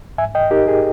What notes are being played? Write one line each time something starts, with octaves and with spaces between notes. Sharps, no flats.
G#2 E5 G#5
D#5 G5
D#4 G4 A#4
G#4